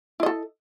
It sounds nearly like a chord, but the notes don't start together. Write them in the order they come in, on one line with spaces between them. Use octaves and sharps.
E4 D#5 A4